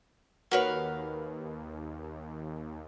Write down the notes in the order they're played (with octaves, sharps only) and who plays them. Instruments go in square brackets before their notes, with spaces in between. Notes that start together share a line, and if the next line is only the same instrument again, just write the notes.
[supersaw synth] D#2 [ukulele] F#4 C#5 [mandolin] A#4 B4 F5